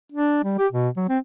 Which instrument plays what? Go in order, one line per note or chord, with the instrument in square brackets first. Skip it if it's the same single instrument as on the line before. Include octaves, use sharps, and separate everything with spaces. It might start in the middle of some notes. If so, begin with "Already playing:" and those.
[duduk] D4
G3
G4
B2
F#3
C4